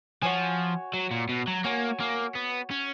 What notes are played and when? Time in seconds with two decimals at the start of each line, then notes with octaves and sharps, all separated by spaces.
0.22 F3 F#4 C#5 G#5
0.94 F#3
1.11 A#2
1.29 B2
1.47 F#3
1.64 A#3 F#4 C#5 G#5
2.00 A#3
2.35 B3
2.71 C#4